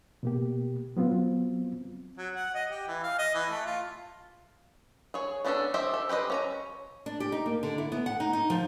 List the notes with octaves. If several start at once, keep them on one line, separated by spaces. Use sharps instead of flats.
B2 A#3 G4
F#3 B3 C4 F4
F#3
F#5
D#5
G4
E3
F5
D#5
E3
A3
F4
G#4 C#5
B3 C#4 D4 F#4 A4
G4 C5 D#5 E5
A4
G4 B4 C5 D#5
C#4 E5 A#5
D4
G4
D#4
A#3
D3
E4
B3
F#5
D#4
D#4
F3